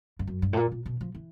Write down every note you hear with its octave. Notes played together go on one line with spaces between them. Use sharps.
G2
F#2
G2
A2
A#2
A#2
B2
F3
E3